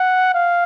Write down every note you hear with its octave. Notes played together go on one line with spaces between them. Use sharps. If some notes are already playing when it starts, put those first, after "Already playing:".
Already playing: F#5
F5